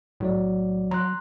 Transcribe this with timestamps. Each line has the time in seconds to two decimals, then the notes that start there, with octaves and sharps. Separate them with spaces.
0.20 B1 A2 F#3 D5
0.91 F#3 A#5 C6 F#6